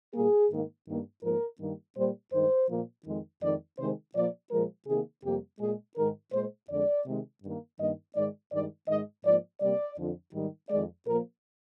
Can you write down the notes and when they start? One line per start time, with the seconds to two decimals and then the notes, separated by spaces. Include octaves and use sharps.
0.14 A#2 G3 A#3 G#4
0.50 G#2 D#3 A#3
0.87 G2 D#3 A#3
1.23 G#2 F3 A#3 A#4
1.59 G2 D#3 G3 A#3
1.96 A#2 G3 A#3 C5
2.33 G2 D#3 G#3 C5
2.69 A#2 F3 A#3
3.05 F2 D#3 G#3
3.42 F2 D#3 G#3 D5
3.78 C3 D#3 G#3 C5
4.14 A#2 F3 A#3 D5
4.51 A#2 F3 G#3 A#4
4.87 C3 D#3 A#3 G#4
5.24 F2 C3 G3 A#3 G4
5.60 A#2 G#3 G#4
5.96 G#2 D#3 G#3 A#4
6.32 A#2 G#3 C5
6.70 F2 D3 G#3 D5
7.06 C3 D#3 G#3
7.42 G2 D#3 A#3
7.79 G2 D#3 G3 A#3 D#5
8.15 G#2 D#3 G#3 D5
8.52 G2 D#3 G#3 D5
8.88 G#2 D#3 G#3 D#5
9.24 G#2 F3 A#3 D5
9.61 C3 G3 A#3 D5
9.98 F2 D3 F3
10.33 G#2 D#3 G3
10.69 F2 D#3 G#3 D5
11.06 A#2 F3 A#3 A#4